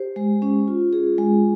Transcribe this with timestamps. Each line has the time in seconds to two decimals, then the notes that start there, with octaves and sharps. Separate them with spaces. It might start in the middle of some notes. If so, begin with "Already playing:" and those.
Already playing: G4 C5
0.16 G#3
0.42 C#4
0.68 F4
0.93 G#4
1.18 G#3